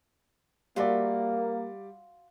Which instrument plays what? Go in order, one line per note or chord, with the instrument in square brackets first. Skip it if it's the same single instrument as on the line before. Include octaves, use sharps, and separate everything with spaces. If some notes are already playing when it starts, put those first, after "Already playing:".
[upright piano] G3 D5 [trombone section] A#3 [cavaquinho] F4 F#4 E5